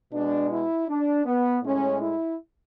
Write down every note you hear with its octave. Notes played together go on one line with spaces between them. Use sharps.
B2 G#3 D4
E4
D4
B3
A2 G#3 C#4
E4